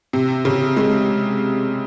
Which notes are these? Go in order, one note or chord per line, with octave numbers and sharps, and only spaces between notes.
C3
C#3
G#3